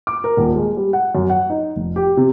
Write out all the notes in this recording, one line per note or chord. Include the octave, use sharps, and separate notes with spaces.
D6
A#4
D#1
G#3
G3
F#5
F#2
F#5
D#4
F1
G4
C3